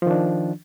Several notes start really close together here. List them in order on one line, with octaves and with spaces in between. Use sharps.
F3 D#3 D4